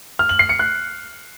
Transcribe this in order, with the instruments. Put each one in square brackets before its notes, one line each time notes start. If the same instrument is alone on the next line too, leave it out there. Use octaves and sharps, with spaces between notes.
[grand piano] F6
F#7
C7
C#7
F#6